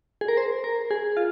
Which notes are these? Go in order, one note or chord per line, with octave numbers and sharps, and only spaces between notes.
G#4
A#4
C5
A#4
G#4
F4